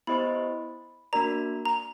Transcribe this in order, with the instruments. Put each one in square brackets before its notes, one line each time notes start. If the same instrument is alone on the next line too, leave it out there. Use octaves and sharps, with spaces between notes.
[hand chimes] B3 E4 G4 C5 D#5 [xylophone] B5
[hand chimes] A#3 D4 F#4 A#4 D5 [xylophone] A#5
[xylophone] A#5